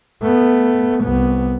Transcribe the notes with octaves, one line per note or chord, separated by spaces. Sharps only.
A3 B3
C2 B3